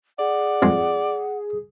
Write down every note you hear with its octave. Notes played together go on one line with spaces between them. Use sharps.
G#4 D5 F#5
F2 G#3 C6